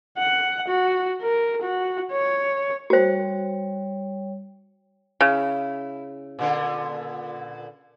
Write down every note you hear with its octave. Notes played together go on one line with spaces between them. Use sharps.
F#5
F#4
A#4
F#4
C#5
G3 F#4 C5 C#5
C#3 E4
A#2 D3 B3